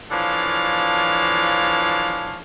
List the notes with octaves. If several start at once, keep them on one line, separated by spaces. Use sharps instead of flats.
E3 F3 D4 A4 C#5 F5